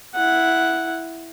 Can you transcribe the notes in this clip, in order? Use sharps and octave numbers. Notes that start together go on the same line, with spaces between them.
E4 F#5